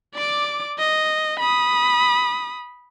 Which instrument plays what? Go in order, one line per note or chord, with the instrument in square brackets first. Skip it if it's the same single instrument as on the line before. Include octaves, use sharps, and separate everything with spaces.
[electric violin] D5 D6
D#5
B5 D#6